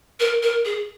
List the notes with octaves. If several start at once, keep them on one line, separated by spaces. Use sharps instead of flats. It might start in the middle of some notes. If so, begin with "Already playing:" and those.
A#4
A#4
G#4